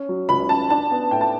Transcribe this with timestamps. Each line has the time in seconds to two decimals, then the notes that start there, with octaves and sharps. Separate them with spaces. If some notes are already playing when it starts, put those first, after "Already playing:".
Already playing: C#4
0.09 F#3
0.29 C#2 B5
0.49 C#3 A5
0.70 D4 A5
0.91 B3
1.11 A2 G5
1.21 A5